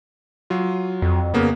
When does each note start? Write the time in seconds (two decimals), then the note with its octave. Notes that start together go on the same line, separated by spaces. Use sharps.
0.50 F#3 F4
1.02 F2
1.34 C#3 A#3 B3